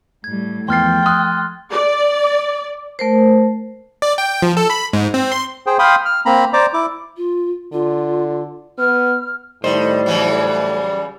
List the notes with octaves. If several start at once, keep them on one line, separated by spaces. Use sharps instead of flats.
A2 G3 G#6
E2 F3 A3 G5 C6 F6 A6 C7
C6 D#6 F6 F#6
D5
A3 A#4 C5
D5
G5
F3
A4
B5
G#2
C4
C6
G#4 C5 G5
F5 G5 B5 C6 D#6
F6
A#3 C4 A#5 B5
C5 D5 A#5 D6
E4 D6
F4
D3 F4
B3 F6
A2 D#3 G3 C5
C#3 E3 F#3